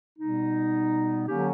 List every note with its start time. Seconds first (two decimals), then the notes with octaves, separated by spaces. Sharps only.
0.18 B2 G3 B3 D#4
1.26 D3 F#3 A#3 C#4 G4